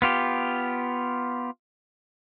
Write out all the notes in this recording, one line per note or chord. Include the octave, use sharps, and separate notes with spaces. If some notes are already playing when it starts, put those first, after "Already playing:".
B3 F4 G4